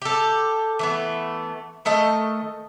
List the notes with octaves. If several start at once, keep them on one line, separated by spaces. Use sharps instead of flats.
G4 A4
E3 A3 B3
D#3 A3 D#5 A5